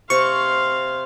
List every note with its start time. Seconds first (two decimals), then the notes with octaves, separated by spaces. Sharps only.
0.10 C3 C4 F5 C6 C#6